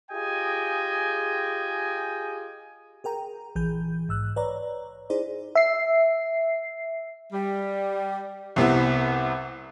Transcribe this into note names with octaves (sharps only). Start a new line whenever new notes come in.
F4 G4 G#4 D#5 G5 G#5
G#4 A#4 G5 A#5
A#1 E3 G#4 G6
G#2 E6 F#6
B4 C#5 D5 A#5
D#4 E4 G#4 C5 D5
E5 C7
G3
C2 C3 B3 E4